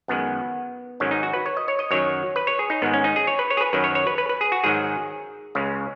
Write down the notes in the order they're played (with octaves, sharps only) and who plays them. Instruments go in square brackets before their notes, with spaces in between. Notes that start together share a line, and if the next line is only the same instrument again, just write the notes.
[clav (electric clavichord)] F#2 D#3 G#3 B3
G#2 D#3 F#3 C#4
D#4
F#4
B4
C#5
D#5
C#5
D#5
F#2 D#3 F#3 C#5
B4
C#5
G#4
D#4
G#2 D#3 G#3 B3
C#4
D#4
G#4
C#5
B4
C#5
G#4
B4
F#2 D#3 F#3 B4
C#5
C#5
B4
B4
B4
G#4
F#4
G#2 D#3 F#3 G#4
C#2 C#3 G#3